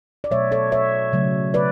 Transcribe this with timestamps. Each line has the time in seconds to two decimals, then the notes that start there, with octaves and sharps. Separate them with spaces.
0.24 D5
0.31 B2 F#3 A3 C#5 E5
0.52 A4 C#5
0.72 C#5 E5
1.13 C#3 F#3 A3
1.54 B4 D5